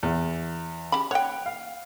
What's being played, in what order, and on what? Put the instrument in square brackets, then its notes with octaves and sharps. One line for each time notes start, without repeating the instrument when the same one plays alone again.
[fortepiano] E2
[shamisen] C#3 G4 B5
[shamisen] C#5 G5 [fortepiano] F#5
[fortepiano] F5